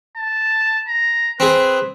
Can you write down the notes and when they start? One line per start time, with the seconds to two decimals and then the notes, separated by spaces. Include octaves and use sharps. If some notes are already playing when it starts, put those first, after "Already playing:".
0.17 A5
0.88 A#5
1.40 C4 G#4 B4